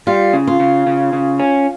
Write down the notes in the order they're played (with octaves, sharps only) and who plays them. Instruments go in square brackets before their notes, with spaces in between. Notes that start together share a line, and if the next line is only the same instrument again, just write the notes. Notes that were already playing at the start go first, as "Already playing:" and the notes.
[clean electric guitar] G3 [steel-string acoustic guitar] F4
[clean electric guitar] C#3
[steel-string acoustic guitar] F4
[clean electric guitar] C#3
C#3
C#3
C#4